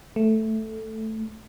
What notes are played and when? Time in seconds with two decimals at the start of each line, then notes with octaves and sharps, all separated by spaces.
0.16 A3